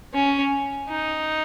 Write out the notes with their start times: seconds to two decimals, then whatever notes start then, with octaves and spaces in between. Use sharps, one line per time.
0.14 C#4
0.89 D#4